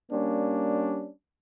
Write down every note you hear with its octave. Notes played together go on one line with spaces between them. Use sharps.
G3 A#3 C#4 D4